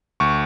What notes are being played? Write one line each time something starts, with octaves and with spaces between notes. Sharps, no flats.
D2 C#6